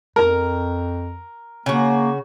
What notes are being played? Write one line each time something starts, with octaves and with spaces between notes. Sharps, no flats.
F2 A#4 A#5
C#3 A#3 F#4